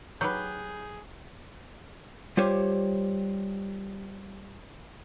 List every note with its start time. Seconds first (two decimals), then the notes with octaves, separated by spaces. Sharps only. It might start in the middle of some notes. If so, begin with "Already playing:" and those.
0.21 F#3 D#4 G4 G#4 B4 G6
2.37 G3 F4 G4 C5 C#5